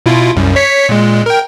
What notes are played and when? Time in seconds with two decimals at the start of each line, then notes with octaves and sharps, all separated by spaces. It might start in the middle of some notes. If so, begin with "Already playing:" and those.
0.06 B2 E4 F4
0.36 C2 F#2
0.56 C#5 B6 C#7
0.89 A#2 G#3
1.26 A#4 G5